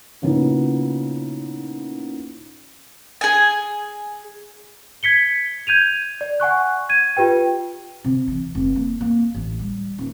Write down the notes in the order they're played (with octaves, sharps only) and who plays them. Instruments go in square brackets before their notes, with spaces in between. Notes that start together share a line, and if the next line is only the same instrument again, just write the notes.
[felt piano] A#2 C#3 B3 D#4 E4
[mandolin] G#4 G#5
[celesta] G#6 B6 C#7 G7
G6 G#6 D#7 F7
D5
F#5 G#5 C#6 F#6
G#6 D#7
F4 G4 B4 G5
[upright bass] C3
E3
F1
A#3
A#3
A1
G3
D#1